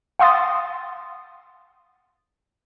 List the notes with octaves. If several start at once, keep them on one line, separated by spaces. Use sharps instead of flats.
F5 F#5 C6 D#6 A6